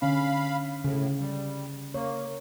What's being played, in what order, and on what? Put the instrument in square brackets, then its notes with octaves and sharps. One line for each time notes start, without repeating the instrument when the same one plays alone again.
[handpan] D3 C#4 [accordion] F5 B5
[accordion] A2 [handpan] C#3
[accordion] G3
[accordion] A#3 [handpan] C#5